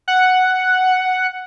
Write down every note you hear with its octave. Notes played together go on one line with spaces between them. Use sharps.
F#5